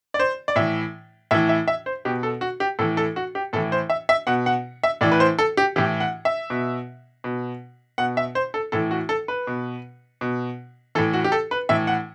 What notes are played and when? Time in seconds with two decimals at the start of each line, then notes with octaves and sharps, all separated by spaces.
0.14 D5
0.19 C5
0.48 D5
0.56 A2 E3 E5
1.31 A2 E3 E5
1.49 E5
1.68 E5
1.86 C5
2.05 B2 G4
2.23 A4
2.41 F#4
2.60 G4
2.79 A2 E3 A4
2.97 A4
3.16 F#4
3.35 G4
3.53 A2 A4
3.56 E3
3.72 C5
3.90 E5
4.09 E5
4.27 B2 F#5
4.46 F#5
4.83 E5
5.01 A2 E3 D5
5.12 B4
5.20 C5
5.39 A4
5.57 G4
5.76 A2 E3 G4
6.00 F#5
6.25 E5
6.50 B2
7.24 B2
7.98 B2 F#5
8.17 E5
8.35 C5
8.54 A4
8.72 A2 E3 A4
8.91 F#4
9.09 A4
9.28 B4
9.47 B2
10.21 B2
10.95 E3 A4
10.98 A2
11.13 F#4
11.24 G4
11.32 A4
11.51 B4
11.69 A2 E3 E5
11.87 F#5